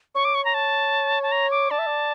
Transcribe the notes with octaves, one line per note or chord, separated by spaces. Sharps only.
C#5 C#6
D6
C#6
A#5
A5
A5
A#5
D6
D5 A5
E5
D5